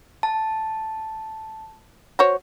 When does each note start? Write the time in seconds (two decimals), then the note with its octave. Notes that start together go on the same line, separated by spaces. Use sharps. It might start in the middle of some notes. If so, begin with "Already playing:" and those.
0.23 A5
2.19 F#4 C5 C#5